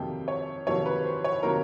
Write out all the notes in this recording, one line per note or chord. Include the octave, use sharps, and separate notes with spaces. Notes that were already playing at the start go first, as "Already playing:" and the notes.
Already playing: F2 C3 D#3 F#3 A#3 G5
C#5
F2 C3 D#3 F#3 A#3 C#5
B4
C5
C#5
C3 D#3 F#3 A#3 A#4